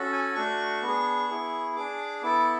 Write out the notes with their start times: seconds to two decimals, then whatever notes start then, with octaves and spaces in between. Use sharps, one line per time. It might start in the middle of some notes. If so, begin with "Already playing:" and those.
Already playing: C#4 F#4 A4
0.12 G#5
0.35 A3 D4 F#4 C#6
0.82 B3 D4 G#4
1.29 B3 E4 G#4
1.76 D4 G#4 D6
2.22 B3 E4 A4 D6